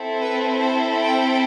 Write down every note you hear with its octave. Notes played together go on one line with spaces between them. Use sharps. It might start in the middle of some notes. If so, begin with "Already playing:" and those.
Already playing: C4 E4 A4
B4
C5
G5